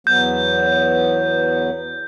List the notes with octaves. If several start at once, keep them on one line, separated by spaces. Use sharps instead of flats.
E2 F#3 B3 G6